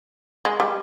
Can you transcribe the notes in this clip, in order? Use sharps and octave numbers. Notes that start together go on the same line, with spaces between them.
G#3
G3